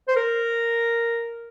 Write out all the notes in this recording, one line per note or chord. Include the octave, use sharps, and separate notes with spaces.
C5
A#4